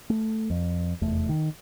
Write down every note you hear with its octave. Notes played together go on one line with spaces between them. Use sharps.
A3
F2
F1 E2 A3
D#3